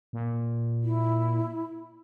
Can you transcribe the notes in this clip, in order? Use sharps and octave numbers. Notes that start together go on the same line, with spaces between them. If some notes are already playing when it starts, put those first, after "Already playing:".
A#2
E4